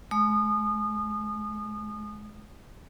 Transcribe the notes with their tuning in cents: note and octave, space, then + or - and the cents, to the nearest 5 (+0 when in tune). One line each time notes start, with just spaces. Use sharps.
G#3 +40 D#6 -30